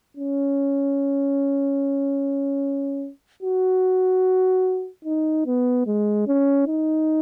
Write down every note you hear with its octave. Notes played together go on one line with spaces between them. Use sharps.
C#4
F#4
D#4
B3
G#3
C#4
D#4